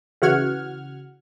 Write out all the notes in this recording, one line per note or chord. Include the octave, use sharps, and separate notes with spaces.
C#3 E3 F#4 F#5 F6 G#6